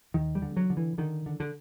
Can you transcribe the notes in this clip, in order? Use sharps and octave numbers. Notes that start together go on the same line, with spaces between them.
D#2 D#3
G3
D3
F#3
D3
E3
D3 D#3
D3
D3